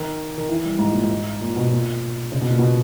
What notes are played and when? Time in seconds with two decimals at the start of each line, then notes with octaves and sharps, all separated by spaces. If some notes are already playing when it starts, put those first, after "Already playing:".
Already playing: D#3
0.38 D#3
0.49 E3
0.65 G3
0.79 G#2
0.91 A#2
1.04 G#2
1.41 A#2
1.56 B2
1.71 A#2
2.32 C#3
2.41 B2
2.50 A#2
2.59 B2